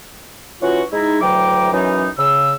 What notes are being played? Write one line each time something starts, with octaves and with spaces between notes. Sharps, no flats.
E3 C#4 F4 F#4
G#3 D#4 E4
D2 E3 F#3 G5 A#5 D6
F#2 E3 F#3 C#4 D#4
C#3 E6